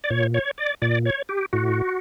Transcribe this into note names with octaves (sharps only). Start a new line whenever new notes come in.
D5
A#2 C#5
C#5
D5
A#2 D5
C#5
G4
A2 F#4